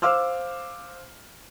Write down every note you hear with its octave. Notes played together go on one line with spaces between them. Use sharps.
C5 F5 D6 E6 F6